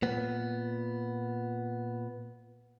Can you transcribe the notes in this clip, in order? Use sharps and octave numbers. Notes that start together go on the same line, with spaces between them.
A#2 B3